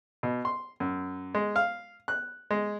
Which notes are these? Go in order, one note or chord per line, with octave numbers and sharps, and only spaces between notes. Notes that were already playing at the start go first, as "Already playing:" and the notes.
B2
C6
F#2
G#3
F5
F#6
G#3